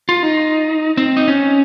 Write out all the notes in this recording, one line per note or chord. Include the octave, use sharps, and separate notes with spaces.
F4
D#4
C4
D#4
C#4